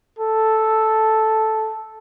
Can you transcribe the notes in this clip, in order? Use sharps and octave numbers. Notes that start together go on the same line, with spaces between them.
A4